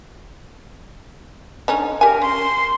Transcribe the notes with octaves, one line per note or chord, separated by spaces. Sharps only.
D3 C#4 D#4
G4 A#4 G#5
C#4 C6